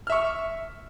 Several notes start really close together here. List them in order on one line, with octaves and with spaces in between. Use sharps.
F6 E5 C#6